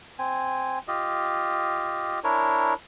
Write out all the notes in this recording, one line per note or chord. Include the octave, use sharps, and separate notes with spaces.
C4 G#5
F4 G4 D#5
D4 E4 A#4 C#5